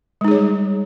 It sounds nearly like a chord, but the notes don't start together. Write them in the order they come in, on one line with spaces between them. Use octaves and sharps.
G#3 D#4 G#4 C#5 G3